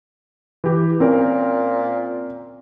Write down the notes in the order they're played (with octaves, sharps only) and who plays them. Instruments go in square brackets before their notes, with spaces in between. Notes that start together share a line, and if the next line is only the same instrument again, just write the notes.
[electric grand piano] E3 G4
[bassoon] A#2 [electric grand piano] C4 C#4 A#4